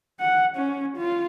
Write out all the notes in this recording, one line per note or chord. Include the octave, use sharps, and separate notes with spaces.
F#5
C#4
F4